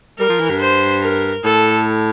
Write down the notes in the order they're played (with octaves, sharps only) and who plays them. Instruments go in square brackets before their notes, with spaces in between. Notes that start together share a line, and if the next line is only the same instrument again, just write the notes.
[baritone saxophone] G3 [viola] A#4
[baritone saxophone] F3
E3
G2
[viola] C5
A#4
[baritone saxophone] A2 [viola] A4